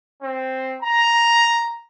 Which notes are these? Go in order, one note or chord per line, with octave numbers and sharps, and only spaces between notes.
C4
A#5